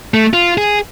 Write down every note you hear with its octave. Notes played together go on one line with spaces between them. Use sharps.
A3
F4
G#4